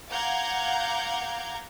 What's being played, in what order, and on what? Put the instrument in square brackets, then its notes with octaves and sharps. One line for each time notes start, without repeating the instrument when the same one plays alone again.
[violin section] F5 F#5 A#5 D6 G6 G#6